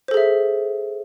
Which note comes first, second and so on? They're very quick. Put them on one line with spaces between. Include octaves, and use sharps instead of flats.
C5 A4 G#4 E5